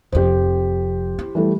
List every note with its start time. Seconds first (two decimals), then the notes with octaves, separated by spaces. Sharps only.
0.12 F1 F2 G4 C5
1.19 E4
1.35 E3 G3 A3